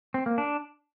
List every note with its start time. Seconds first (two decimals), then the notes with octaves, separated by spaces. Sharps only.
0.14 C4
0.26 A#3
0.38 D4